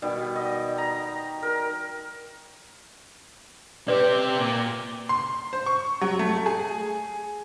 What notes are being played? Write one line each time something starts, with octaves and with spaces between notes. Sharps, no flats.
B2 D#3 G3
D#5
A#5
A#4
C3 G4 B4 D5
A#2
C6
C5
C#6
F#3
A3
G#4